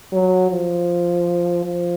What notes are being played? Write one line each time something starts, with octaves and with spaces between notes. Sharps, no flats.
F#3
F3
F3